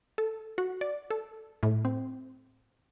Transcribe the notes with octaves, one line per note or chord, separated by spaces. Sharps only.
A4
F#4
D5
A4
A2
C4